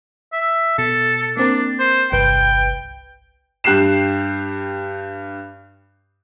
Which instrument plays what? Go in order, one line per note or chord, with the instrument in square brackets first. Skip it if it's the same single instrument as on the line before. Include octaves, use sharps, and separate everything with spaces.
[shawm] E5
[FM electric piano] B2 [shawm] A4
[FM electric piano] A#3 C4 A#4 [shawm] D4
[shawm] C5
[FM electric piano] G1 C2 B4 [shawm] G5
[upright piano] G2 G4 F#6 C7 E7